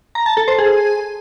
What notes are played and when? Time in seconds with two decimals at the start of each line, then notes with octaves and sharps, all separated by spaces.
0.15 A#5
0.26 A5
0.37 A4
0.48 C5
0.59 G#4